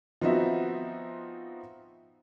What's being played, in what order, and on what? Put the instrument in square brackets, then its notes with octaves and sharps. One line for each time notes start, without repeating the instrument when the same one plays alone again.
[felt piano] F3 B3 C4 D#4 F#4 E5